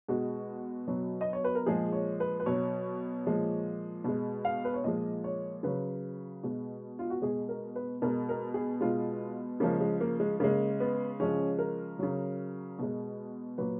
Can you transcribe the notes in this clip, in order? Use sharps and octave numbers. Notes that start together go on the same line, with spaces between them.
B2 G#3 F#4
B2 F#3
D#5
C#5
B4
A#4
A#2 F3 G#3 G#4
C#5
B4
B4
B2 F#3 C#5
A#2 F3 G#3
B2 G#3
F5
B4
C#5
A#2 F3 G#3 D#5
C#5
C#3 F#3 B4
B2 G#3
F4
F#4
B2 G#3 G#4
A#4
B4
B2 G#3 A#4
A#4
G#4
B2 G#3 F4
C#3 F3 G#3 A#3
G#3
A#3
G#3
C#3 G#3 A#3
B3
C#3 F3 G#3 C#4
A#4
C#3 F#3
B2 G#3
A#2 F#3 B4